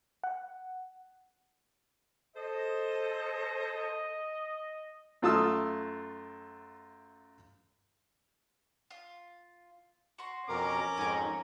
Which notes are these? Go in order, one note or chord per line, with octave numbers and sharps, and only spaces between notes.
F#5
A4 C5 D#5
F#2 A3 F4 A5 D#6 E6
F4
F#4 C6
F2 B2 C#4 A#4 A#5 D6
F2 G#2 A#4 G#5